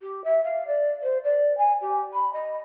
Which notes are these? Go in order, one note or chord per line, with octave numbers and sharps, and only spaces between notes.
G4
E5
F5
D5
C5
D5
G#5
G4
B5
D#5